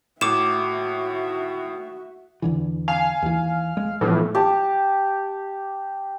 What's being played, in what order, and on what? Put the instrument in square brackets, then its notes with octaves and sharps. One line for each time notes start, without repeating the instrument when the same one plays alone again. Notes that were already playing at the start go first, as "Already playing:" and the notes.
[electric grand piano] A2 [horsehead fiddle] F#4 E5 [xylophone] D6 E7
[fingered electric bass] E2 D3 E3
[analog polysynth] F5 [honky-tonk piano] G#5
[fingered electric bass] D#2 E3
G#3
[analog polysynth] A2 [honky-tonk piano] E3 F3 B3
[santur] G4 A5